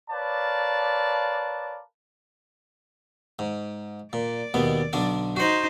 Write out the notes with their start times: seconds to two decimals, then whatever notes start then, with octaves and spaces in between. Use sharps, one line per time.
0.11 A#4 B4 C#5 D5 F5 A5
3.39 G#2
4.13 A#2 D5
4.54 D#2 B2 B3
4.93 B1 D3 D4
5.37 D#4 F#4 C5 F#5